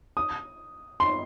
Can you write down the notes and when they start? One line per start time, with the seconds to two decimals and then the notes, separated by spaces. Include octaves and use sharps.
0.17 D#6
1.00 C6